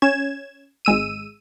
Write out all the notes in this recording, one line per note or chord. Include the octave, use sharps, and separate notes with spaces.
C#4 G#6 E7
G#1 G#3 E6 D#7